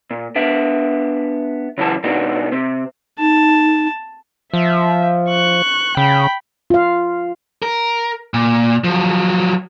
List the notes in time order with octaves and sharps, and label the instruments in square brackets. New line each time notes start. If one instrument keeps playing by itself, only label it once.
[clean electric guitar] A#2
B3 D4 E5
C#3 E3 F#3 A5
B2 A#3 D4 D#4 F#4
C3 C4
[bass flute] D#4 [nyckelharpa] A5
[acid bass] F3 [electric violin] E5
[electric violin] C#6 F#6
[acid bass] C#3 [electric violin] G5 B5
[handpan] F4 F5
[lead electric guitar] A#4
A#2
F3 F#3